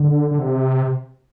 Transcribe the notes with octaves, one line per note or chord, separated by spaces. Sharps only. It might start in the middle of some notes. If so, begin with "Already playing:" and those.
Already playing: D3
D3
C3